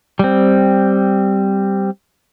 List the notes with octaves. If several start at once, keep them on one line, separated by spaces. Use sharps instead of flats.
G3 C4